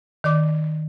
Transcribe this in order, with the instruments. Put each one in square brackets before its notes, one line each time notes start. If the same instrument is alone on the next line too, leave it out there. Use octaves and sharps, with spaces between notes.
[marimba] D#3 D5 D6